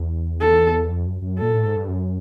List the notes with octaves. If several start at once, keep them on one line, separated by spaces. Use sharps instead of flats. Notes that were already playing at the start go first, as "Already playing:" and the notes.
Already playing: E2
A4
F2
F#2
F#2
A#2 A4
A2
G#2
G2
F#2